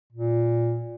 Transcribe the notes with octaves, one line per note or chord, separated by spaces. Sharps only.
A#2